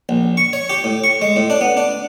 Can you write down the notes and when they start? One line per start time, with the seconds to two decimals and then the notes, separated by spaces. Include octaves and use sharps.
0.09 A#1
0.37 C#6
0.53 C#5
0.69 G4
0.84 A2
1.04 C#6
1.21 G#3
1.36 A2
1.50 D4
1.61 B3
1.77 D4